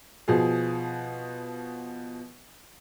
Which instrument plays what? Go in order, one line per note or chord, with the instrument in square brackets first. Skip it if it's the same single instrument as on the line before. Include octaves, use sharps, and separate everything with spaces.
[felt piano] B2 F3 G#4